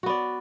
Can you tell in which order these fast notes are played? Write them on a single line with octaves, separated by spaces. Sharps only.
F#4 B3 D5